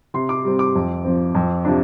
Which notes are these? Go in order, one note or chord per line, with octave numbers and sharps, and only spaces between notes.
C3 C6
D6
G3 C4
D6
F2
F3 C4
F2
C3 F3 D4